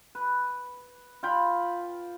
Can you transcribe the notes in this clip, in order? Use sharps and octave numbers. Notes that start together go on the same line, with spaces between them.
B4
F4 G5 B5